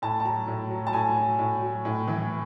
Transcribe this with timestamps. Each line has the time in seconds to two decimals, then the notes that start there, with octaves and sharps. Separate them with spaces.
0.02 A2 A5
0.20 A5
0.25 F#3 A#5
0.48 A2
0.71 F#3
0.87 A5
0.93 A2 G#5
1.16 F#3
1.39 A2
1.62 F#3
1.85 A2
2.08 E3